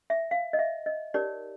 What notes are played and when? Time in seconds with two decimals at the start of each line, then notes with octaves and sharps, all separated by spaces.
0.10 E5
0.31 F5
0.53 D#5
0.59 E5
0.86 D#5
1.14 D#4 G4 A#4 C#5 D5